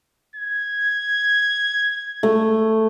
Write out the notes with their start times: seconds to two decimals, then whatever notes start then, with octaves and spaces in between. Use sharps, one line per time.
0.36 G#6
2.23 A3